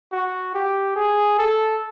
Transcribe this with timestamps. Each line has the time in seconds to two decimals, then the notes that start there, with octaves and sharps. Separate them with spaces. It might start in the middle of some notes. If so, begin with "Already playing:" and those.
0.12 F#4
0.54 G4
0.96 G#4
1.38 A4